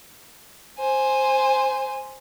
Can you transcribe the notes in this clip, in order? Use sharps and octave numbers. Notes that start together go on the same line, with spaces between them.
C5 G#5